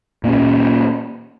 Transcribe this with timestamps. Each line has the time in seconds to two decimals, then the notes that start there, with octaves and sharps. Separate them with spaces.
0.24 A#2 A#3 C#4